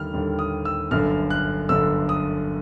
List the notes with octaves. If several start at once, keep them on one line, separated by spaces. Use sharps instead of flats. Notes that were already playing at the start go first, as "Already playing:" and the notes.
Already playing: D#2 D3 G3 F6
D#2 D3 G3
D#6
E6
G1 F#2 D3 F6
F#6
G1 F#2 D3 E6
D#6